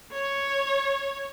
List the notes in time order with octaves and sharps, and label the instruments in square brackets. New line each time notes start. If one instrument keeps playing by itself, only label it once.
[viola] C#5